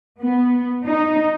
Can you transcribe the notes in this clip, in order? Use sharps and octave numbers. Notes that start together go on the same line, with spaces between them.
B3
D#4